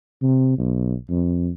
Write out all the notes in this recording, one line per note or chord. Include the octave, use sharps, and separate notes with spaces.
C3
B1
F2